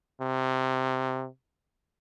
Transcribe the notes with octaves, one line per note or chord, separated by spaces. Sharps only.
C3